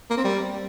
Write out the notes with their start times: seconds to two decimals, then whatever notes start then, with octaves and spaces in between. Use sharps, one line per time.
0.10 A#3
0.17 C4
0.24 G3